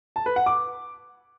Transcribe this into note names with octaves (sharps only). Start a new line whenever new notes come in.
A5
B4
F#5
D6